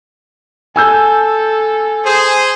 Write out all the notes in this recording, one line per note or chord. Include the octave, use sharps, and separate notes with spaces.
A4 G#5 E6 G6
G#4 C5